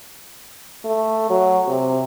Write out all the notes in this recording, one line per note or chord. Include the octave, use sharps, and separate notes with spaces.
A3
F#3
C3